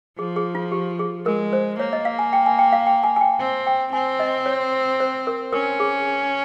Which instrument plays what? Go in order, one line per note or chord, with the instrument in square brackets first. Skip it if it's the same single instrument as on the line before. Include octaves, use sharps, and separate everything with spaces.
[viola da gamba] F3 [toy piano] G#4
[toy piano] G#4
F4
G4
G#4
[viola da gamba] G#3 [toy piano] A#4
[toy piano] C5
[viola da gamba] A#3 [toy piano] C#5
[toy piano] D#5
F5
G#5
G5
G#5
G5
F5
G5
G#5
G#5
G5
[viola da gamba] C4
[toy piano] G5
[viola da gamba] C4 [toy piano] G#5
[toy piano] D#5
C#5
C5
A#4
[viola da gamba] C#4 [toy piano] A#4
[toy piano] G#4